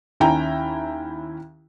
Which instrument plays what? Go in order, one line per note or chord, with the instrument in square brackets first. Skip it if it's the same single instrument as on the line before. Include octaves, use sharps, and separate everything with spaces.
[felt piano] D#2 C#4 E4 G5 A#5